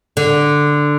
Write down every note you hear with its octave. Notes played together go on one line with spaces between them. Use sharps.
D3